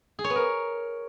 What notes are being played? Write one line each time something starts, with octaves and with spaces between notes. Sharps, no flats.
G#4
C#5
B3
A#4